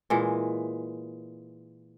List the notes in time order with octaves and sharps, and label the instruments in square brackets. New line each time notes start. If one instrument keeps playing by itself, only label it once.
[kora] A#2 E3 G#3